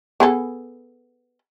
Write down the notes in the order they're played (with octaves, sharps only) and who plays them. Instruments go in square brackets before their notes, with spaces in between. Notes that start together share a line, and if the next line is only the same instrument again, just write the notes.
[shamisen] B3 G#4 A4